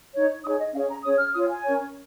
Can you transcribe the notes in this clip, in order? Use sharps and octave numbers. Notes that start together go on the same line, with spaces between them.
D#4 C#5
D#4 G#4 C#5 D#6
D#5
C#4 G#4 C#5 F5
A#5
C#4 G#4 C#5 D#6
F6
F4 C#5 D#6
G#5
C#4 A#4 C#5